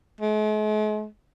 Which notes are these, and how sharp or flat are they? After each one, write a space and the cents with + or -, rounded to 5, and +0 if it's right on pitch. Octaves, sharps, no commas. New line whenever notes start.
G#3 +45